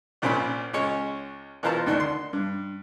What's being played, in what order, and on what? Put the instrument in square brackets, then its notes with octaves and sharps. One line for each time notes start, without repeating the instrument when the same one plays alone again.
[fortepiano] A#1 A#2 C4 C#4 B5
C#2 G#3 C#4 C#5
B2 E3 F4 A#4 C5 A5
D2 D#3 D4
C6
G2